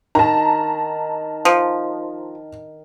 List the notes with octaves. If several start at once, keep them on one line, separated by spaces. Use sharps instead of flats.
D#3 A5 A#5
F3